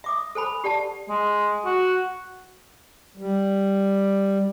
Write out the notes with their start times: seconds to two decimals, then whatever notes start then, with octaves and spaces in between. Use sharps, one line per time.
0.04 E5 D6 D#6
0.35 A4 C5 G#5 B5
0.64 G4 D5 F#5 A5
1.10 G#3
1.65 F#4
3.17 G3